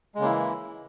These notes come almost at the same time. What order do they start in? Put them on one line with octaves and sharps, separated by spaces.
G#3 C#3 A#3 E4 E3